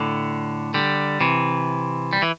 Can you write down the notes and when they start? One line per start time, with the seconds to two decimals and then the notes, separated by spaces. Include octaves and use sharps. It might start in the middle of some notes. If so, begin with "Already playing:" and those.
Already playing: A2 D3
0.74 D3 G3
1.20 C3 E3
2.13 G3
2.22 E3